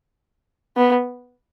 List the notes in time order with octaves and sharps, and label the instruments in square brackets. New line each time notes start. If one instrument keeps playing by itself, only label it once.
[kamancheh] B3